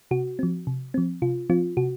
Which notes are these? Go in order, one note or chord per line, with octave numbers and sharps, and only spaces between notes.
C3 F#4
F3 C4
C3
F3 C4
C3 F4
F3 C4 F4
C3 F#4